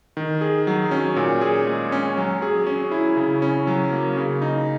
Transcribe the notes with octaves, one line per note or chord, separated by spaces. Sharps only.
D#3
G#4
F#3
C#4
A#2
G#4
G#3
C#4
F#3
G#4
C#4
E4
C#3
C#4
F#3
A#3
C#3
D#4